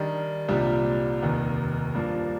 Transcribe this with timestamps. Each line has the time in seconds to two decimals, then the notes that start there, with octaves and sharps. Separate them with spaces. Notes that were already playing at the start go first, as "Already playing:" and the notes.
Already playing: D#3 G3 D4
0.48 C2 A#2 G3 D4 G4
1.22 F1 D#2 D#3
1.95 G2 F3 A#3 D4